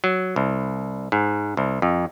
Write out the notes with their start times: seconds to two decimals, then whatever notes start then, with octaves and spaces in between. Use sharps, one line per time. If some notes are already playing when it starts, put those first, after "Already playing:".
0.04 F#3
0.36 C2
1.12 G#2
1.57 C2
1.82 F2